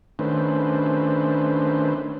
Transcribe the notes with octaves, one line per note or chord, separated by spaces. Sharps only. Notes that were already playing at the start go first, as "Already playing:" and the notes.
D#3 A3 C#4 D4 B4 C5